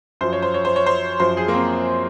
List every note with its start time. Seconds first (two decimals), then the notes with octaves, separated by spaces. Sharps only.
0.21 F#2 F3 C5
0.33 C#5
0.42 C5
0.54 C#5
0.65 C5
0.76 C#5
0.86 C5
1.20 F#2 F3 C5
1.37 G#4
1.48 A#3
1.54 C4